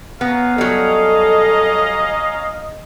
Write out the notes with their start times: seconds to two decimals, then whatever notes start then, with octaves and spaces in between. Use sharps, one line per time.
0.21 B3 C#4 F5 A#5
0.58 F#3 G3 A4 D#5